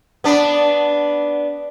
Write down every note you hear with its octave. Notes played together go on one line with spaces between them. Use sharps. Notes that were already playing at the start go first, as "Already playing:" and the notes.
B3 D4